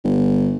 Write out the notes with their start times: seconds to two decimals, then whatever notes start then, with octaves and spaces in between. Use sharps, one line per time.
0.04 G1